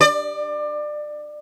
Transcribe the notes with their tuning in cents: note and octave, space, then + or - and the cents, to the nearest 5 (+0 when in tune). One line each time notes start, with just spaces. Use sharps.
D5 +25